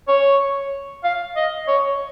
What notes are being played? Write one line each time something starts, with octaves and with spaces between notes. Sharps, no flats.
C#5
F5
D#5
C#5